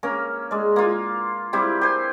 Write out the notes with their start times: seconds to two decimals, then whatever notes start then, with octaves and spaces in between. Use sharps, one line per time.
0.03 A#3 C#4 A#4
0.51 G#3 D5
0.76 A#3 F4
1.53 G3 C4 E4 G4
1.81 G4 C5 G#5